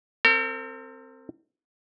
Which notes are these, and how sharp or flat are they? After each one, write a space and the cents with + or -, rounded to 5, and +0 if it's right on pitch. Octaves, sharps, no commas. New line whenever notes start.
C4 +0 A#4 -45